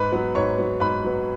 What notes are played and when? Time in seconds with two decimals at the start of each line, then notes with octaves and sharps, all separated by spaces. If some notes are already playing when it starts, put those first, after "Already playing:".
Already playing: G#2 B4 B5
0.12 F#3 B3
0.35 G#2 C#5 C#6
0.58 F#3 B3
0.80 G#2 B4 B5
1.04 F#3 B3